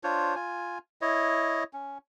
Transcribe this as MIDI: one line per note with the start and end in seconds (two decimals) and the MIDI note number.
0.04 0.35 62
0.04 0.35 65
0.04 0.35 72
0.04 0.35 73
0.36 0.78 65
0.36 0.78 80
1.01 1.64 64
1.01 1.64 73
1.01 1.64 75
1.73 1.98 61